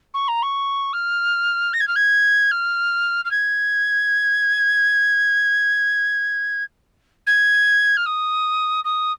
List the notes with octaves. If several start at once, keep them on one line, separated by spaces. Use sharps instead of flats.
C#6
A#5
C#6
F6
A#6
G#6
F6
G#6
F6
F6
G#6
G#6
F6
D#6
D#6